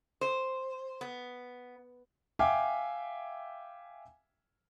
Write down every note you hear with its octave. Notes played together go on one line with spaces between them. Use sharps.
C5
B3
E5 F5 G5 G#5 D6